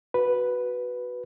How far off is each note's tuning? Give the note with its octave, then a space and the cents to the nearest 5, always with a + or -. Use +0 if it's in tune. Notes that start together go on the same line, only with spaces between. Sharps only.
F#4 +0 B4 +0